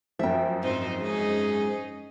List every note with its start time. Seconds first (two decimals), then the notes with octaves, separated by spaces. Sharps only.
0.19 F#2 F3 E5 G5
0.63 G#2 C4 D#4 C5
0.99 G#3 C#4 D#4 G#4